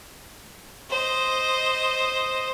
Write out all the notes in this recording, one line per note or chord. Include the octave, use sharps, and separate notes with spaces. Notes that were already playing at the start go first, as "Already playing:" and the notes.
C5 D#5